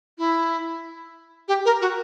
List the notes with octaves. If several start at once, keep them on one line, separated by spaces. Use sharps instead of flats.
E4
G4
A#4
F#4